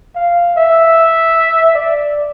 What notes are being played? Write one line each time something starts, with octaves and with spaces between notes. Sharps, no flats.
F5
E5
D5